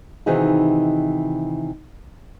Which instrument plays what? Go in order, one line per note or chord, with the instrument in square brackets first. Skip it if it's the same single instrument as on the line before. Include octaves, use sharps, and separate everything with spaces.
[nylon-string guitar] C3 D#3 E3 D#4 F#4 G#4